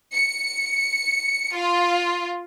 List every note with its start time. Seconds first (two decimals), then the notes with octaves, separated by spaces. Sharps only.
0.13 C#7
1.55 F4